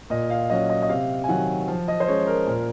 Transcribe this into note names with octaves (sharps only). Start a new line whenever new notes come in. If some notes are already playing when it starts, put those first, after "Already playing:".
A#2 D#5
F5
F#3 C#4 D#5
D#5
D#5
C3 F5
G#5
D#3 F#3 F#5
F3
D#5
C5
G#3 C#4 C#5
A#4
A#2